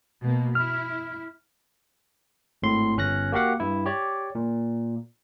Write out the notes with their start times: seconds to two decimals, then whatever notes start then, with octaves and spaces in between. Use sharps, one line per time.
0.22 B2 A#3
0.55 E4 F6
2.62 G#1 A2 C6
2.97 G1 C#4 F#6 A#6
3.32 A#3 F#4 G4 F5 F#5
3.60 G2 E4
3.86 G4 C#5 D5
4.35 A#2